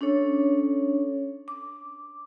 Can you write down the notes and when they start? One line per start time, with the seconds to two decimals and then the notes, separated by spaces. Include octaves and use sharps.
0.01 C#4 D4 A4 C#5
1.48 D6